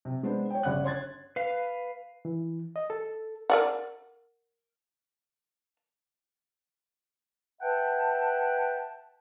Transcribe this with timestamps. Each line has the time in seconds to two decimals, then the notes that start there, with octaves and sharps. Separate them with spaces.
0.05 C3
0.23 G#3 B3 D4 C5
0.50 C#5 G5
0.63 G1 C#3 D5 F#5 F#6
0.84 C#5 C6 G#6 A6
1.36 B4 F5
2.25 E3
2.76 D#5
2.90 A4
3.50 A#4 D5 F#5
7.62 B4 E5 F#5 G5 A5